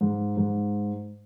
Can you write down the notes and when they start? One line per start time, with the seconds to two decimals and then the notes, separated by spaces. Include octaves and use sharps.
0.01 G#2
0.37 G#2